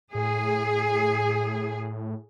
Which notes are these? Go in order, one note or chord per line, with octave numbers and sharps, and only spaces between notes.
A2 G#4